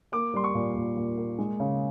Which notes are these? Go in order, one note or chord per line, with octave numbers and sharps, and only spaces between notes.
A#3 D6
G3 C6
C#6
A#2
A#2
A#2
A#3
G#3
C#3